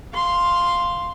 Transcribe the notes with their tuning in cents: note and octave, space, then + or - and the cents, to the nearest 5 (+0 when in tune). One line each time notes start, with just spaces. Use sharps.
F5 +0 C6 +0